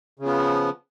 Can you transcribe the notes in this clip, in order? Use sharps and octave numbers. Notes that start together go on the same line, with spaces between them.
C#3 F3 B3